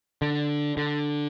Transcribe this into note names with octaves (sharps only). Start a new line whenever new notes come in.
D3
D3